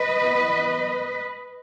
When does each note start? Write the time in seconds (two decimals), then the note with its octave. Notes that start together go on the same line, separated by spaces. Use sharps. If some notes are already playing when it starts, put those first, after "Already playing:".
Already playing: B4 D#5
0.21 E3 B3